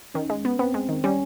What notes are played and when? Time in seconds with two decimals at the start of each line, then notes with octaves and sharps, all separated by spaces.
0.15 D#3 C#4
0.30 G#3
0.45 B3
0.59 B3 C4
0.74 G#3
0.89 D#3
1.04 G3 C#4